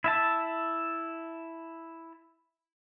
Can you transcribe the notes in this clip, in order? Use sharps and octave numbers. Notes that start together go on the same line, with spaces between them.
E4 E5 A5